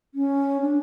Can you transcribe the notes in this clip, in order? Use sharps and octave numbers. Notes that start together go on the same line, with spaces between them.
C#4
D4